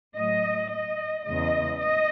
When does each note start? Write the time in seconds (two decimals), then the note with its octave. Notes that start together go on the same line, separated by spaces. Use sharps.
0.15 A2 F#3 D#5
0.70 D#5
1.25 E2 C#3 G#3 D#5
1.79 D#5